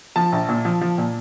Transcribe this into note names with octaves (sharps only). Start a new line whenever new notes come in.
F3 A5
A#1
A#2
F3
F3
A#2